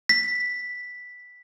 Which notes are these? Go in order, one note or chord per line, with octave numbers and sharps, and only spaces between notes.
B6